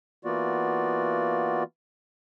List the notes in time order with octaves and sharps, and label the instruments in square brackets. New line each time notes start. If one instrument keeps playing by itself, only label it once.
[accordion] E3 A#3 B3 F4 F#4 D5